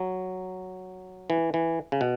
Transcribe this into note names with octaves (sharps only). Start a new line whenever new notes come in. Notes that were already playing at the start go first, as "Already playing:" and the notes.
Already playing: F#3
E3
E3
C#3
B2